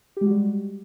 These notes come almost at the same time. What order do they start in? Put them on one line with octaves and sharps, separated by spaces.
G4 G#3 F#4 G3